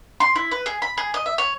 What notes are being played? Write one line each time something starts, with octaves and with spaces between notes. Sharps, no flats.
C6
E4
B4
G#4
B5
G#4
D#5
E5
C#5